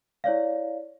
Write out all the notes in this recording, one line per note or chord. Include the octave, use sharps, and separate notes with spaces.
E4 C#5 D5 F5